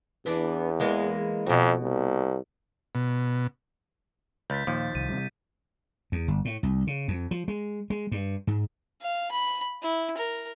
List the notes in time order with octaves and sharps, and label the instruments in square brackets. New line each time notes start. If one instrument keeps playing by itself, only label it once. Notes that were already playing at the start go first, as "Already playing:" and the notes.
[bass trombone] E2 [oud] E3 B3 D4
[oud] E3 G#3 A#3
[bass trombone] F2 [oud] B2 F#4
[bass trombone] C2
[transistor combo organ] B2
[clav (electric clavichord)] C#2 [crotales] G6 A6 B6
[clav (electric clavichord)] D#2 F3 [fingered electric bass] A#2
[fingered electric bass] C2 [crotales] D#7
[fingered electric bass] C3 G3
[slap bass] E2
G1
A2
C2
C#3
F2
F3
G#3
G#3
G2
G#2
[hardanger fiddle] F5
B5
E4
A#4